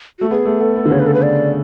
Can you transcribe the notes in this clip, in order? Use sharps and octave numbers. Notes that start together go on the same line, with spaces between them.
A3 F#4
B3 G#4
A3
B3 A4
B3
D3
C#3 C#5
B4
A4
B4
D5